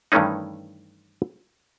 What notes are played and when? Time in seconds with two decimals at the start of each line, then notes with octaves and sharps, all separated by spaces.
0.12 G2 D#3 E3 A3 C#4 D#4